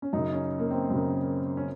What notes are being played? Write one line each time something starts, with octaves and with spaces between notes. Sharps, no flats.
C#4
F#2 C#3 D#4
C#4
A#3
C4
F#2 C#3
C#4